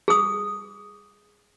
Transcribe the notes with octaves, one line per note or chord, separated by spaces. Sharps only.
G#4 D#6